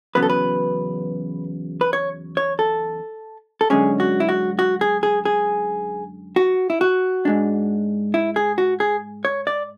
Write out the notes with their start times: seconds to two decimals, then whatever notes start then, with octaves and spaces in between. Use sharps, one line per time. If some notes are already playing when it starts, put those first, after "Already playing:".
0.15 E2 C#3 F#3 B3 B4
0.23 A4
0.30 B4
1.81 B4
1.93 C#5
2.37 C#5
2.59 A4
3.61 A4
3.70 F#2 D3 G#3 C#4 G#4
4.00 F#4
4.20 E4
4.29 F#4
4.59 F#4
4.81 G#4
5.03 G#4
5.25 G#4
6.36 F#4
6.70 E4
6.81 F#4
7.25 G#2 G#3 D4
8.14 E4
8.36 G#4
8.58 F#4
8.80 G#4
9.25 C#5
9.47 D5